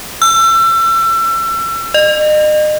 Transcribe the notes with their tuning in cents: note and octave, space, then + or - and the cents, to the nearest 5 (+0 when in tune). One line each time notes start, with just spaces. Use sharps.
E6 +35
D#5 -35